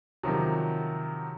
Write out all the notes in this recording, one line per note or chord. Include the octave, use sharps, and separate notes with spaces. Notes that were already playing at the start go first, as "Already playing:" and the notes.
C3 D#3 F3 F#3